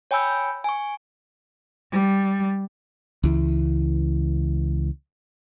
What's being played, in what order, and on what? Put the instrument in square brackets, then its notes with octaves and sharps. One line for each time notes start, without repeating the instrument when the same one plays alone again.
[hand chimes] C#5 G5 G#5 B5 E6 G6
G#5 C#6
[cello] G3
[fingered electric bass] C#2 E3